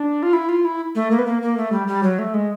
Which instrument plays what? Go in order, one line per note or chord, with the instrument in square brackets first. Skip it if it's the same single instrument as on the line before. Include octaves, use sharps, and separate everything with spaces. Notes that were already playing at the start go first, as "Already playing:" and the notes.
Already playing: [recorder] D4
F4
E4
F4
E4
A3
A#3
B3
A#3
A#3
A3
G3
G3
F#3
A3
G#3